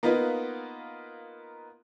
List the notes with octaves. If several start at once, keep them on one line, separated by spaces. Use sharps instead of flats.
A#3 B3 D#4 F4 B4